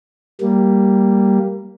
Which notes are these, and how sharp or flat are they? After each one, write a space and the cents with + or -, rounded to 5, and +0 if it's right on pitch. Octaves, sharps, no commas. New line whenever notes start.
G3 -5 A#3 +0